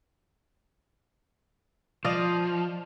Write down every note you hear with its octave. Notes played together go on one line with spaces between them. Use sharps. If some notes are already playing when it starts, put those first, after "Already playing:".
F3 D5 D#5 F5